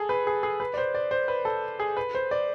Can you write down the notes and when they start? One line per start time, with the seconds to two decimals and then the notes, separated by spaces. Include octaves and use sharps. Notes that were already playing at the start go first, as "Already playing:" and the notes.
Already playing: G#4 A4
0.09 B4
0.27 G#4
0.43 G#4
0.60 B4
0.74 D5
0.77 C5
0.95 D5
1.11 C5
1.28 B4
1.45 A4
1.80 G#4
1.97 B4
2.14 C5
2.31 D5